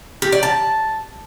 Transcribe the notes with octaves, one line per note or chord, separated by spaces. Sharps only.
G4
D5
A5